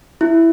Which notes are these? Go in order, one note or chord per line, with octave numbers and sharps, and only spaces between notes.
E4